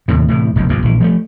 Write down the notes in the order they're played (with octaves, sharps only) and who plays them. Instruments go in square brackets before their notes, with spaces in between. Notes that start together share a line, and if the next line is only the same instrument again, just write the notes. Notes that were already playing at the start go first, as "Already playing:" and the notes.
[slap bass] D#2 A2 C3
A2 C3 E3
F1 B1 E2
A#1 G2 B2
A#1 E3
F3 F#3 A3